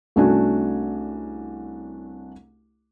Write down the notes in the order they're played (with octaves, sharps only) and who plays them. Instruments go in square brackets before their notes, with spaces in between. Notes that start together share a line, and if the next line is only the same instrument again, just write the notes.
[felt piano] C2 A3 C#4 D4 F#4 G#5